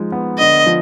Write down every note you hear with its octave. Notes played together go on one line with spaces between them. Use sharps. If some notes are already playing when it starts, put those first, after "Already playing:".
Already playing: F3 G#3 D#4
B3
D3 D#5
F3